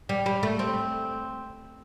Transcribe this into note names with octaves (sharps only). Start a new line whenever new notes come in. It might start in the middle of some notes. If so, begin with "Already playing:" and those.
G3
G3
A3
C4